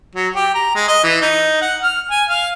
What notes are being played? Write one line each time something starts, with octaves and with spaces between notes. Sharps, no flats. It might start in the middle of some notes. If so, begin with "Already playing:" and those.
F#3
G4
A#5
G#3
D#5
E3
D#4
F#5
F6
G#5
F5